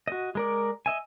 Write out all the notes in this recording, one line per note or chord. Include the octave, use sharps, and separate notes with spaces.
F#4 D#5
G#3 A#4 D5
D#5 E5 G#5